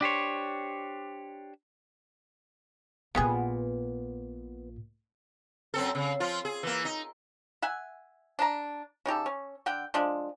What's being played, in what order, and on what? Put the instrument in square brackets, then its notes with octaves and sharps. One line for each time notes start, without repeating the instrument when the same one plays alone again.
[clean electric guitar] D4 G4 C5 C#5
[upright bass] A#1 A#2 [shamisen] G#3 G4 G#4 [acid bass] B3
[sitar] F#2 C4 A4
C#3
F3 F4
G#4
E3 A#3
D#4
[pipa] E5 F#5 G#5
D4 A5 A#5
C#3 D#4 G4 A4
C#4
D3 F#5 G5
F3 G#3 D4